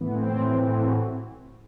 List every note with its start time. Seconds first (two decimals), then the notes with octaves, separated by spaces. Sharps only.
0.01 A2 E3 B3
0.16 C4
0.31 A2 E3
0.62 A2 E3
0.87 F#4